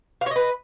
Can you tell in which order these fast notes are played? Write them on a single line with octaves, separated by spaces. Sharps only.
F5 C#5 D#5 B4